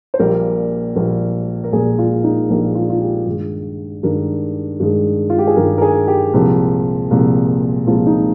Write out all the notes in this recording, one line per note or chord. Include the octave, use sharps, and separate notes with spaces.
C5
A#1 A#2 G3 A#3 A#4
A#1 A#2 G3 A#3
A#4
A#1 A#2 G3 A#3 G#4
F4
D#4
A#1 A#2 G3 A#3 D4
F4
F4
G4
G2 D#3 G#3
G2 D#3 G#3 A#4
G2 D#3 G#3
F4
G4
G#4
G2 D#3 G#3 A#4
A#4
G#4
G4
C2 A#2 F3 G#3
C2 A#2 F3 G#3
C2 A#2 F3 G#3 F4
D#4